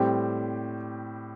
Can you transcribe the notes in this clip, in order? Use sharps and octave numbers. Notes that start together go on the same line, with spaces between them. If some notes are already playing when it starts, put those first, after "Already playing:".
Already playing: A2 G3 C4 G4